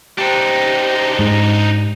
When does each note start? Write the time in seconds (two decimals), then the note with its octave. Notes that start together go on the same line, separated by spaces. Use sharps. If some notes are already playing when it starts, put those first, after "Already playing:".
0.18 D4 D#4 G4 C5
1.19 G#2